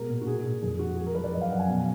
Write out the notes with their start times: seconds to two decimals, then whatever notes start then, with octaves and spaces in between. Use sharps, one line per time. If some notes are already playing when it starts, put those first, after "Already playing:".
Already playing: B2 G#3 A#4
0.09 A#2
0.21 F#4
0.27 G#3 G#4
0.44 A#2
0.62 F2 G#4
0.79 G#3 F#4
0.97 G#3 G#4
1.06 A#4
1.15 F3 B4
1.24 D5
1.33 F#2 D#5
1.41 F5
1.50 F#2 F#5
1.59 G#5
1.68 B2